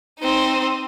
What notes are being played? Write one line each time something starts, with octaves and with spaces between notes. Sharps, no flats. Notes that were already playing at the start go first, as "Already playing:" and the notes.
C4 D#4